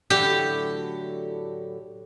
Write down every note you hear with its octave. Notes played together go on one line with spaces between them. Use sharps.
A2 D3 F#3 G4